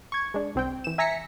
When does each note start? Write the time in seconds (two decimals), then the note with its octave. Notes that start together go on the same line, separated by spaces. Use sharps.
0.12 C#6 G#6
0.34 G#3 D4
0.55 C2 C4 G5
0.84 E3 E7
0.98 E5 G#5 A#5 A#6 B6 C#7